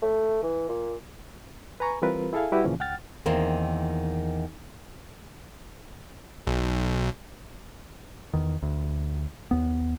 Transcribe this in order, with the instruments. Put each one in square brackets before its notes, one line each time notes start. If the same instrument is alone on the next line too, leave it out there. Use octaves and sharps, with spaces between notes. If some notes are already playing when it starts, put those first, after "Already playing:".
[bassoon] A3
E3
A#2
[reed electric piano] B4 G#5 A#5 C#6
E3 G3 C4 F4 A#4 B4
E4 G#4 A4 E5 F5 G#5
G3 E4 F#4 G4 B4 F#5
D#2 A#2 C#3 E3 F3 C#4
C#2 F#5 G5 F6 A6
[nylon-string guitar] E2 D#3 A#3 C4
[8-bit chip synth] B1
[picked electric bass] E2 D#3
D2
D#2 B3